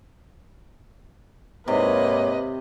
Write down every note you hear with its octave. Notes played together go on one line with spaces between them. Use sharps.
G#2 C3 A#3 B4 C#5 D#5